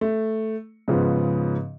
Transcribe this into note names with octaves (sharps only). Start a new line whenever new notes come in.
A3
G#2 C#3 F3 B3